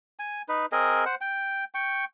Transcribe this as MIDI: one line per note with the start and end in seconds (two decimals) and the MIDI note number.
0.19 0.42 80
0.49 0.66 63
0.49 0.66 71
0.72 1.05 60
0.72 1.05 68
0.72 1.05 70
0.72 1.05 75
1.06 1.15 72
1.06 1.15 78
1.21 1.64 79
1.75 2.05 79
1.75 2.05 85